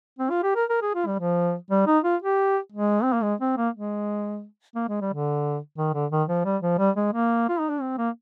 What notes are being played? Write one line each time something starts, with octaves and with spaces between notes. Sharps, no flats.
C4
F4
G4
A#4
A#4
G#4
F4
G3
F3
G3
D#4
F4
G4
G#3
C4
A#3
G#3
C4
A#3
G#3
A#3
G#3
G3
D3
D#3
D3
D#3
F3
G3
F3
G3
G#3
A#3
F4
D#4
D4
C4
A#3